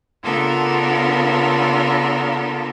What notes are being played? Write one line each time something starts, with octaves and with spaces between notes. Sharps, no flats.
C#3 B3 D4 F4 A4 A#4